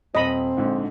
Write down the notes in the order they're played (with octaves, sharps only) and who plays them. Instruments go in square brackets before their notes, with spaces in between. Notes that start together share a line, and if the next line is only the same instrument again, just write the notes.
[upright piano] D#1 [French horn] C4 [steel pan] D#5 B5
[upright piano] A#1 G#2 D3